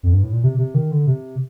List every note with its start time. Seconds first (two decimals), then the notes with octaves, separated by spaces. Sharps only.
0.03 F2
0.13 G2
0.23 A2
0.33 A#2
0.43 C3
0.58 C3
0.74 D#3
0.91 D3
1.07 C3